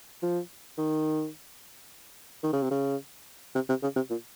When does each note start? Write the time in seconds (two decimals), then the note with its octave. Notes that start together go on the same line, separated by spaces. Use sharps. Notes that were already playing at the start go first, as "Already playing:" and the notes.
0.22 F3
0.78 D#3
2.43 D#3
2.53 C#3
2.62 C3
2.71 C#3
3.55 C3
3.69 C3
3.83 C#3
3.96 C3
4.10 A#2